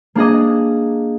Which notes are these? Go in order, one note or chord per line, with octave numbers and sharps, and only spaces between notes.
A#3 D4 G#4 D#5